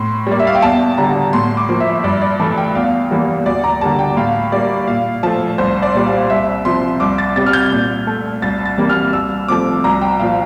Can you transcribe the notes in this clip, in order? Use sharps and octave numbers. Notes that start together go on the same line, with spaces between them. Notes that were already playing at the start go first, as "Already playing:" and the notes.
Already playing: A2 C6
G3 A#3 D5
E5
F5
G5
E2 A5
D3 G3 A#5
A2 C6
D6
F3 A#3
E5
G2 D5
D5
E3 A3 A5
G5
E2 F5
E3 G3 A#3
D2 D5
A#5
D3 G3 A#3 A5
G5
A2 F5
G3 A#3 D5
A#2 F5
F3 A3 A5
C2 C5
D5
A#2 G3
F5
C2 E5
C3 F3 C6
C2 D6
A6
C3 G3 A6
F6
G6
A#2
A3
C2 A6
A6
C3 E3 G3 A#3
F6
C2 E6
C3 F3 A3 D6
C2 A#5
G5
A#2 F3 F5